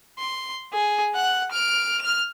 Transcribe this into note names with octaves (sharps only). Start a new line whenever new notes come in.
C6
G#4
F#5 F#6
F6 D7
F6 F7